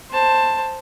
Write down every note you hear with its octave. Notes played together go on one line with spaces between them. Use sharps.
C5 A5